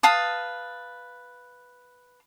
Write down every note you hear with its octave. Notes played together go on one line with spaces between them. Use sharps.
B4 F5 A5 D#6